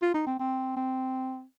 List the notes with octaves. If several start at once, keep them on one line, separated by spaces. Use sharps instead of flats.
F4
D#4
C4
C4
C4